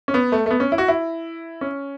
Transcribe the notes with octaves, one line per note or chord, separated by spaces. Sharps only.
C#4
B3
A3
A3
B3
C#4
E4
F#4
E4
C#4